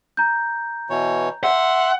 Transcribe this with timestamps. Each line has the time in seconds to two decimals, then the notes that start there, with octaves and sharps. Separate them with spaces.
0.17 A#5 G6
0.90 B2 E3 C#5
1.44 E5 F#5 C6